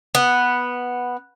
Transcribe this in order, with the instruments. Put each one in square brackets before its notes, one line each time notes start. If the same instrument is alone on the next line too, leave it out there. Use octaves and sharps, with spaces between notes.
[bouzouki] B3